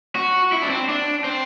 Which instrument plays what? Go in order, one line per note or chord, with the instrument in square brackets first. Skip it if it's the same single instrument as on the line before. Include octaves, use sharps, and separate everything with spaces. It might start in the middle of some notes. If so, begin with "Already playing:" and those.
[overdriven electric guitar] F#4
E4
D4
C4
D4
C4